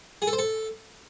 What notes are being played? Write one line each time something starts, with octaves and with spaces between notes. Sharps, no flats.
G#4
A4
C5
A4